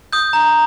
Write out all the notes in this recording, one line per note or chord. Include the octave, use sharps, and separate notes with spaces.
D#6 G6
A#5